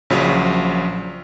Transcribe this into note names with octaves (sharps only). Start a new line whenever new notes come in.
A#1 C#3 F3 F#3